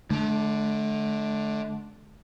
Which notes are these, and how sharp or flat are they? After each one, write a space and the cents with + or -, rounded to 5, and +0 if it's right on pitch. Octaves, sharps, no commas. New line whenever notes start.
D3 +0 A3 -45